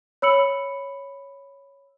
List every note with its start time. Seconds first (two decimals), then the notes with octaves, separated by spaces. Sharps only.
0.22 C#5 B5 E6 C#7 F#7